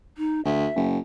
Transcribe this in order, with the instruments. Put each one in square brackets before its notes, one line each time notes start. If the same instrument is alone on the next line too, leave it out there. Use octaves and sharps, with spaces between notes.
[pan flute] D#4
[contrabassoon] D2 [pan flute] E5
[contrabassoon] F#1